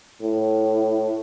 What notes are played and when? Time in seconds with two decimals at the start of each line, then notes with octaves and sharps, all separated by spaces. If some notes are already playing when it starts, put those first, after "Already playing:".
0.22 A2